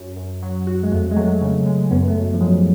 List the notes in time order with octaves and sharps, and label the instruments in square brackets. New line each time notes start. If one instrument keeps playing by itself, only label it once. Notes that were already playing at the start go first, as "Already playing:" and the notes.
Already playing: [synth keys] F#2
F#2
F#3
F#4
[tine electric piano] G#3
[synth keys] F2 [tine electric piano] A3
[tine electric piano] G#3
[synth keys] F#3 [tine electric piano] A3
[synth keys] C#3
G#3
[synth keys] F#2 [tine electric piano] B3
[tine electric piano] A3
[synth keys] F#2
[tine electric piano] F3
[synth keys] G#2 [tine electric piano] F#3